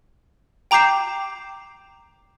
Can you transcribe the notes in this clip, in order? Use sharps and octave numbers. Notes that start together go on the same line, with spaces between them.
G5 A#5 D6 G6 C7 E7